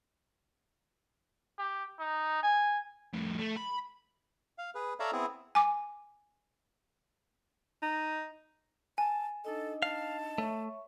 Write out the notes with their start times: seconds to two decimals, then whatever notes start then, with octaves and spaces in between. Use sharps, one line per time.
1.59 G4
1.99 D#4
2.43 G#5
3.14 F2 A2
3.38 A3
3.57 B5
4.58 F5
4.75 G#4 B4
5.00 A4 C#5 D5 E5 F5 A#5
5.13 B3 C4 E4 G#4
5.55 G#5 D6
7.82 D#4
8.98 G#5 A5
9.45 D4 D#4 A4 D#5
9.83 F5 A5
10.38 A3 C#5 E5 C#6